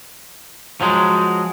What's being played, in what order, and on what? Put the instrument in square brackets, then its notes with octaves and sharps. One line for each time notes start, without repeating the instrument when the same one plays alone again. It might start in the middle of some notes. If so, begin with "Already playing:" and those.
[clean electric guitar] F3 F#3 G#3